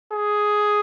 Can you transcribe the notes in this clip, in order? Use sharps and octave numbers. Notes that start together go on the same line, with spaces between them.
G#4